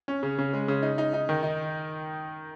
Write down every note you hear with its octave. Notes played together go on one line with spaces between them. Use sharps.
C#4
C#3
C#3
G#3
C#3
D#4
D#4
D#4
D#3
D#4